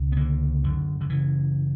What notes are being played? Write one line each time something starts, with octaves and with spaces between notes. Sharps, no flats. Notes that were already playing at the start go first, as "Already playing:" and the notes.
Already playing: C#2 B2
B3
D3 A#3
F#2 D3
D3
C#3 E3